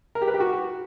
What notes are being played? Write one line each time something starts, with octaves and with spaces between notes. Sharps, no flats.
A#4
G4
B4
G4
F#4